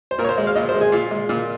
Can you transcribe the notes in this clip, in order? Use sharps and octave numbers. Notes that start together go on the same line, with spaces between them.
C5
A#2 A#4
C#5
C5
G#3
F5
A#2 D#5
C5
G#3
G#4
A#2 F4
G#3
A#2